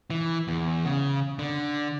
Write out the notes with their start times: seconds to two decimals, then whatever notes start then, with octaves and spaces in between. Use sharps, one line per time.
0.10 E3
0.48 E2
0.85 C#3
1.39 D3